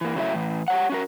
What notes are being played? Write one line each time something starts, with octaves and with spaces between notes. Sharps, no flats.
E3 A#3
C#3 F#3 A3 E4 E5
A2 E3
G4 C#5 F#5
C#4 F#4 A#4